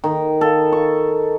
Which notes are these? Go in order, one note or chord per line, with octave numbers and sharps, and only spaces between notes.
D#3
A4
C#6